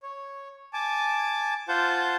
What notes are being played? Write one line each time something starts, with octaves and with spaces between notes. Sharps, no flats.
C#5
G#5 A5 D6
F4 C5 F#5 A5 G6